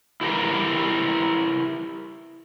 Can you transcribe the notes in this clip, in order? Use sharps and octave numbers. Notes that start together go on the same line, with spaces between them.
E4 G4 A#4 B4